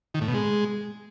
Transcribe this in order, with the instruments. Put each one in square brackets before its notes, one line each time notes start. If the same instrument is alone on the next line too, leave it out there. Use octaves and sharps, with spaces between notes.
[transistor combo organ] D#3
A2
B2
G#3